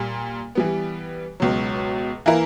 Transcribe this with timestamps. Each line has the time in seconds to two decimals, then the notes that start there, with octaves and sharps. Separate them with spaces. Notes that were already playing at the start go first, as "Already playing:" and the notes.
Already playing: A#2 G3
0.55 E3 G3 B3
1.40 C#2 B2 F#3
2.26 E3 A#3 E4 A#4